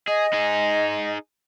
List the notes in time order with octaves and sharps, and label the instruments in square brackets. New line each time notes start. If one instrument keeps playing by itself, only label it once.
[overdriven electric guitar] G#4 [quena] D#5
[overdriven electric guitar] D#4 G#4